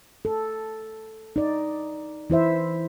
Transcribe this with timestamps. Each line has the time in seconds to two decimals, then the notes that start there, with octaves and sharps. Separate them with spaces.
0.25 A4
1.36 D#4 D5
2.30 E3 E4 C5 E5